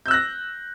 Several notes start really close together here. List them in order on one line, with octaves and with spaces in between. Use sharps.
G6 E6 F#6 A#6